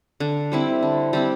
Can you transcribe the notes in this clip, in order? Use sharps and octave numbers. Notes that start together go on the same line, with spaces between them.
D3
G3 C4 E4
D3
G3 C4 E4